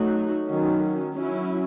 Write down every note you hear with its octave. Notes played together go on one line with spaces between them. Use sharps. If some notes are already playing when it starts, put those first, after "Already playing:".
Already playing: F#3 A3 D#4 F#4
D#3 F#3 C#4
F#3 C#4 E4